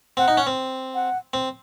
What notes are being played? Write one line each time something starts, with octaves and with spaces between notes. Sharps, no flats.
C4 F#5
D#4
C#4
C4
F#5
C4